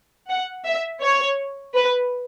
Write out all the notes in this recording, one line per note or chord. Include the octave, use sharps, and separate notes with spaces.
F#5
E5
C#5
B4